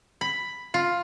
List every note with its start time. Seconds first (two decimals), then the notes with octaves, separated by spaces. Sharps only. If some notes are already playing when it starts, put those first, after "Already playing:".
0.21 B5
0.74 F4